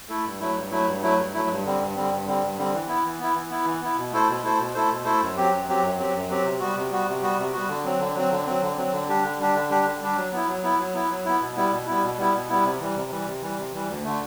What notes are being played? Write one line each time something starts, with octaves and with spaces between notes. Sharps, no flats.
A3 E4 A4
G2
F#3 A3 E4
G2
F#3 A3 E4
G2
F#3 A3 E4
G2
F#3 A3 E4
G2
D3 G3 C4
G2
D3 G3 C4
G2
D3 G3 C4
G2
D3 G3 C4
E3
B3 E4
E3
B3 E4
E3
B3 E4
E3
B3 E4
B2
A3 E4 A4 C5
B2
A3 E4 A4 C5
B2
A3 E4 A4 C5
B2
A3 E4 A4 C5
F#2
F#3 C4 G4
F#2
F#3 C4 G4
F#2
F#3 C4 G4
F#2
F#3 C4 G4
C3
G3 B3 F#4
C3
G3 B3 F#4
C3
G3 B3 F#4
C3
G3 B3 F#4
D3
F#3 C4
D3
F#3 C4
D3
F#3 C4
D3
F#3 C4
D3
G3 D4 G4
D3
G3 D4 G4
D3
G3 D4 G4
D3
G3 D4 G4
F#3
B3 E4
F#3
B3 E4
F#3
B3 E4
F#3
B3 E4
B2
G3 B3 E4
B2
G3 B3 E4
B2
G3 B3 E4
B2
G3 B3 E4
C3
E3 G3
C3
E3 G3
C3
E3 G3
C3
E3 G3
D2
D3 A3